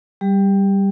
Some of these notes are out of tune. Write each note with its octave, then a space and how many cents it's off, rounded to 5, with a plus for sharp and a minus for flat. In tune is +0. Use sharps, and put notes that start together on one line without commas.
G3 +0 G4 +25